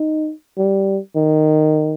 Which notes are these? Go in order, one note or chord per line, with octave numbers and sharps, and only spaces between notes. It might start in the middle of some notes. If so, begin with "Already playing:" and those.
Already playing: D#4
G3
D#3